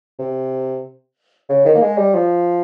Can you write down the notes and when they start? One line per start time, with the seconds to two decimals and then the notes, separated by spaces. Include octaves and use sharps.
0.19 C3
1.49 C#3
1.65 D#3
1.75 A#3
1.82 G#3
1.98 G3
2.15 F3